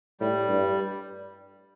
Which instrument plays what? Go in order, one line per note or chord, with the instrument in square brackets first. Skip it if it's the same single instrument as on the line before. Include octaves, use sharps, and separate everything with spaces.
[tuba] A2 [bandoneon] G3
[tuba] G2